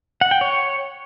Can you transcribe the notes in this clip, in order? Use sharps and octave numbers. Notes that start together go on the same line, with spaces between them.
F#5
G5
C#5